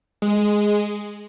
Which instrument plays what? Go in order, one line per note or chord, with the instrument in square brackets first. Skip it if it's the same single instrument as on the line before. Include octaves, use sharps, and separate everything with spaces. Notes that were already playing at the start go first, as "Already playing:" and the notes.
[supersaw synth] G#3